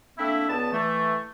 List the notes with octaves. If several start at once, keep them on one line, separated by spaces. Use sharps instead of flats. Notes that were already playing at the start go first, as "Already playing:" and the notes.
A3 A#3 C4 D4 E4 E5
C#2 B3 D5 A5
E3 A3